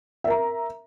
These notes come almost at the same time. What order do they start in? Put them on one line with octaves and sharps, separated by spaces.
E5 A#4 A#5